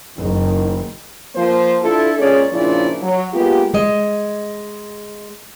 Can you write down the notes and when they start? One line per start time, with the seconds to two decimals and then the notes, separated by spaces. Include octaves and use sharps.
0.17 F#1 D#3
1.35 F3 A#3 C5
1.82 D4 E4 F4 A4
2.18 A#2 G#3 C#4 G#4 C#5 D5
2.52 A#2 C#3 F3 D4 E4 D5
3.02 F#3
3.34 G#3 A#3 B3 F4 G4
3.74 G#3 D#5